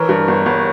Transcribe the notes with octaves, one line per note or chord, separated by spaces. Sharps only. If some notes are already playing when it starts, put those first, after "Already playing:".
Already playing: E3 A#4 C#5
G2
G1
G1